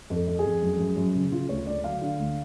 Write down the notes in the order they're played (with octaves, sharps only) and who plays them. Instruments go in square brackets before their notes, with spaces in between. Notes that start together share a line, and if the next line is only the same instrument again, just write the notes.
[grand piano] F2
A4
F2
G#4
F2
F#2
F#2
F#2
C#3
C#3 F4
D2 C#5
D2 D5
F#3 F5
D3
D2